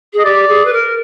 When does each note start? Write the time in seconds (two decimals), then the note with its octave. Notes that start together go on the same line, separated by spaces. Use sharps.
0.13 G#4
0.19 D#5
0.25 G4 D5
0.48 G#4
0.65 B4
0.73 A#4